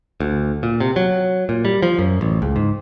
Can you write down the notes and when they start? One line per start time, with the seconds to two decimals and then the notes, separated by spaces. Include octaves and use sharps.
0.20 D2
0.63 A#2
0.80 C3
0.96 F#3
1.49 A#2
1.65 G3
1.83 F3
1.99 F#2
2.21 A1
2.42 C#2
2.56 G#2